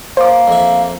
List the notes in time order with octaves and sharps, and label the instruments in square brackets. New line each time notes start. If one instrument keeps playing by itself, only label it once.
[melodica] A#3 [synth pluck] C5 D6
[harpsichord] F2 E5